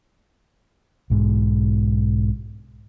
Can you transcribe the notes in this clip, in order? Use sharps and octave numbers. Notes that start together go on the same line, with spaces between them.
B1 G#2